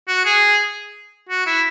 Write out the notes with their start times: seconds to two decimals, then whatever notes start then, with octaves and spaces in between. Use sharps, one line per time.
0.08 F#4
0.25 G#4
1.29 F#4
1.46 E4